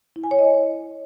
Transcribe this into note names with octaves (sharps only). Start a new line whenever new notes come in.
E4
G#5
C#5
D#5